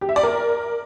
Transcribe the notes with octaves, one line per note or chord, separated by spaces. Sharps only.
G4
E5
D5
A#4